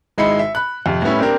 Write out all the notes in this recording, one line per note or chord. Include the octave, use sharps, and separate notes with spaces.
G#1 G#3 D#4 E4 B5 C#7
E5
B5 F#6
F2 C3
A2 G3 B3 C#4 E4
A#3 C4 D4 G4 A#4